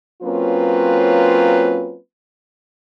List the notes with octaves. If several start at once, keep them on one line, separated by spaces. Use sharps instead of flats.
F#3 A#3 C4 C#4 F4 B4